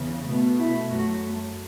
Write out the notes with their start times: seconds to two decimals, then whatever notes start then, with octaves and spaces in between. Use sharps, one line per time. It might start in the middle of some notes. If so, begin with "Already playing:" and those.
Already playing: E2 C#3
0.27 B2 A3 B3
0.59 E4
0.91 F#2 F#3 A3 F#4
1.22 A3